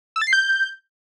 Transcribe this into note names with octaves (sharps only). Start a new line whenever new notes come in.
E6
A6
C7
G6